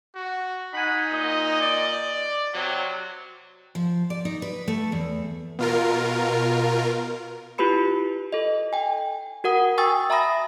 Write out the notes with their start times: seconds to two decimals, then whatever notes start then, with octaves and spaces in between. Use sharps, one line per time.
0.15 F#4
0.74 D#4 F#5 G#5 B5
1.11 A#2 D#5
1.61 D5
2.53 C3 F#3
3.75 F3
4.10 D5
4.25 D#4
4.42 B4
4.68 A3
4.92 E2
5.59 B2 F4 A#4
7.58 E4 F4 G4 B4 B5 C#7
8.33 A4 D#5
8.73 G5 G#5
9.44 F#4 A#4 F#5 D#6
9.78 G5 G#5 C#6 D#6 E6 A6
10.10 E5 A#5 B5 D#6 A#6